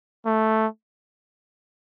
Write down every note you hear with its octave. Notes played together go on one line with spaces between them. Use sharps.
A3